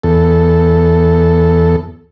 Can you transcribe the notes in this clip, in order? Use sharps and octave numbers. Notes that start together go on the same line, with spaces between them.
E2 A4